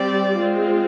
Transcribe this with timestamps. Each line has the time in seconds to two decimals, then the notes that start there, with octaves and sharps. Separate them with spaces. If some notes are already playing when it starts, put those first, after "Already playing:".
Already playing: G3 C4 G4 D5
0.37 G#3 C4 F4